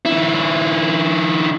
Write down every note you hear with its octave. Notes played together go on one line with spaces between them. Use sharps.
D#3 E4